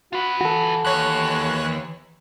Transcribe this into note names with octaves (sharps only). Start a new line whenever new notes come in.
F4 F#4 B4
E3 F#4 A4
D#2 C#5 F#6